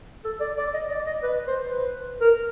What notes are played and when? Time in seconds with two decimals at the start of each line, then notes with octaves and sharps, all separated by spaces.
0.25 A4
0.41 D5
0.57 D5
0.74 D#5
0.90 D5
1.07 D#5
1.23 B4
1.47 C5
1.71 B4
2.21 A#4